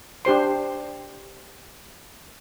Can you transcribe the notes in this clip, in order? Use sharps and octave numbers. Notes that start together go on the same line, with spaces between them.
D4 G4 C5 C6